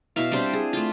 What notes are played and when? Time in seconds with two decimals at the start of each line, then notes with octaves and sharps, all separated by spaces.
0.16 B2 E4 E5 F5
0.32 G3 C4 D4 C5
0.53 G#4
0.73 A3 F4